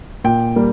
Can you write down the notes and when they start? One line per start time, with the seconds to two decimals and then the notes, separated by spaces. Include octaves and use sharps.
0.24 A#2 G5
0.56 G3 A#3